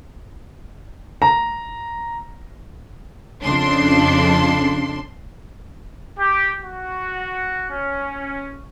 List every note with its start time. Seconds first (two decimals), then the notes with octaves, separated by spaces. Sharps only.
1.22 A#5
3.42 F2 C#3 D4 C6
6.20 G4
6.62 F#4
7.72 C#4